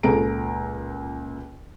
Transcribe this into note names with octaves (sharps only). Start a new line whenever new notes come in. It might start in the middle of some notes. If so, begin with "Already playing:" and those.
C#2 A#2 G#4 A4 A#5 D7